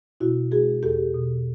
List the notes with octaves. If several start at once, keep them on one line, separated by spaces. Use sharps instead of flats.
B2 E4 F#4
G#3 F#4 G#4
E2 G4 A4
B2